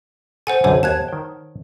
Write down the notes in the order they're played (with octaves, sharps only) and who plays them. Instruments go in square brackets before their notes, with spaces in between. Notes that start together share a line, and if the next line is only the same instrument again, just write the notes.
[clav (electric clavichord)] A4 [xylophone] C5 F#5 G#5
[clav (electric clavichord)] B1 F#2 D3 [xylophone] C5 C#5 G#5
[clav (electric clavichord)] D#2 [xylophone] A5 F#6 G#6
[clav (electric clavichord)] D#3 G5